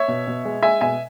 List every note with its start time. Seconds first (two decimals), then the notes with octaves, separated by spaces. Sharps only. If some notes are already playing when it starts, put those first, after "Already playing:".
Already playing: C#5 E5
0.08 B2
0.27 B2
0.45 G#3
0.62 G#3 E5 G#5
0.81 B2 E5 G#5